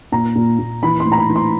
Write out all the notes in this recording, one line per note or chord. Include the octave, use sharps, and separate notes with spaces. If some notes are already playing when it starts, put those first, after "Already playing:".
A#2 A#5
A#2
A#2
E3 B5
C6
A2
A#5
B5
E3
C6